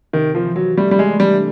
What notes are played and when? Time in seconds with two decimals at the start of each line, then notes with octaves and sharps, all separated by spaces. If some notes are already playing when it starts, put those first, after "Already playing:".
0.13 C3 D#3
0.35 F3
0.46 E3
0.56 F#3
0.78 G3 A3
0.91 G3
0.99 G#3
1.09 D4
1.20 G3